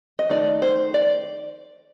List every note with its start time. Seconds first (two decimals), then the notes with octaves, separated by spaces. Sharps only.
0.19 D#5
0.29 D#3 A3 D#4 D5
0.62 C5
0.94 D5